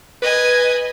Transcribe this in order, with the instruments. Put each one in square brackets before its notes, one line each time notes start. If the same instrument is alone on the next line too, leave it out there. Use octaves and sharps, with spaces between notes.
[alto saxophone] B4 [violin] D#5 G#5